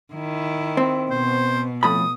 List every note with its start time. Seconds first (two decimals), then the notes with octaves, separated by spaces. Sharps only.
0.13 D#3 E4
0.77 C4
1.10 B2 C5
1.83 F2 A2 B5 D#6